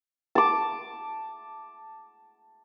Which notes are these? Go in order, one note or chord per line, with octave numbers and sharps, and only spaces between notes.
A5 D6